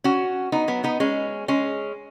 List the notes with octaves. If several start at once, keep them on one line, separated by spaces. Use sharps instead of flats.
C#4 F#4
B3 D#4
F#3 B3
B3 D#4
G#3 C#4
G#3 C#4